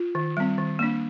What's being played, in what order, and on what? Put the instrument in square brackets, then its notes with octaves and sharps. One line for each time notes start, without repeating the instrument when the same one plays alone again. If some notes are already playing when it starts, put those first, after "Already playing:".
Already playing: [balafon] F4
D#3
G3 C4
D#3
A#3 D4